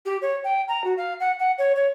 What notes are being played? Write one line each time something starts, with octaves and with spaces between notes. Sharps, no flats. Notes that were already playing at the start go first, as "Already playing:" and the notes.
G4
C#5
G5
A#5
F#4
F5
F#5
F#5
C#5
C#5